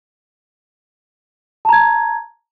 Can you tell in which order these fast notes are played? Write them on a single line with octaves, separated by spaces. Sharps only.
A5 A#5 G#6